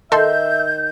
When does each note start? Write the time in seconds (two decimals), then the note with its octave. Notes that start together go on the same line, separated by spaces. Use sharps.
0.12 D#3 A4 E5 C6 G6